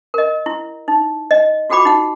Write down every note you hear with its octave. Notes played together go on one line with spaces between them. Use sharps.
A#4 D#5
E4
D#4
D#5
F4 F#4 A4 G5 B5 D6
D#4 F#5